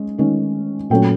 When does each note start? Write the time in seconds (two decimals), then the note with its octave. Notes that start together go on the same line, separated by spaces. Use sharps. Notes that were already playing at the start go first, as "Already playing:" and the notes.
Already playing: G#3 C#4
0.18 D#3 G#3 C#4
0.90 A#2 F#3 A3 C#4 G5